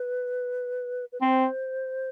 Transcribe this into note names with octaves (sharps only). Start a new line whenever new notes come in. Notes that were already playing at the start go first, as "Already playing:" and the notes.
Already playing: B4
B4
C4 C5